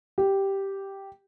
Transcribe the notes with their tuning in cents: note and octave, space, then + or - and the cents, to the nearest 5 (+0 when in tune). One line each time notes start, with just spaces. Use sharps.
G4 -5